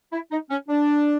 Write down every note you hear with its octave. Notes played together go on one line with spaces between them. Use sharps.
E4
D#4
C#4
D4